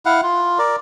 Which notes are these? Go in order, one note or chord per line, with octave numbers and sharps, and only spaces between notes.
E4 F5 F#5
F4
A#4 D5